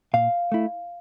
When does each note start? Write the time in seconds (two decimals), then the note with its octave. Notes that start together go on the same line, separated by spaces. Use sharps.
0.14 A#2 F5
0.52 A3 E4